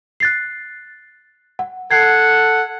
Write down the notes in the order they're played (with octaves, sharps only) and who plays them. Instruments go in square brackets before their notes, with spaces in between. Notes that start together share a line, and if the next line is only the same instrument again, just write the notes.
[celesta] F#6 A6 C7
F#5
[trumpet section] A4 F#5 [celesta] G#6 C7